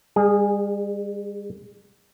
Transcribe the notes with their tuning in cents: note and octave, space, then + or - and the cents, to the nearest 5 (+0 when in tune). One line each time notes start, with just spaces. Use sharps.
G3 +40 G#4 -15